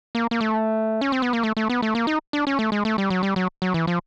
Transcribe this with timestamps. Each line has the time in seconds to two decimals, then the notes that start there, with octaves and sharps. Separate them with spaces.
0.15 A#3
0.31 A#3
0.41 A3
1.01 C#4
1.12 C4
1.22 B3
1.33 A#3
1.43 A3
1.57 A3
1.70 B3
1.82 A3
1.95 A#3
2.07 D#4
2.33 D4
2.47 C#4
2.59 A3
2.72 G#3
2.85 A3
2.98 G3
3.10 F#3
3.23 G3
3.36 F#3
3.62 F#3
3.74 E3
3.87 F3